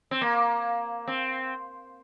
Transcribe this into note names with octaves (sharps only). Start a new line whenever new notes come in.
C4
A#3
C4